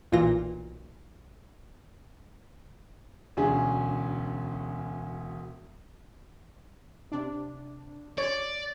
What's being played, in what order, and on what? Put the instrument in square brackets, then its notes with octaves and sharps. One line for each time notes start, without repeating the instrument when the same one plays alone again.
[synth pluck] B1 A#2 E3 F4 A#6
[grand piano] E1 D2 C#4 D4 G#4
[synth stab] C3 D4
[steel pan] C#5 [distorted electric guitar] D5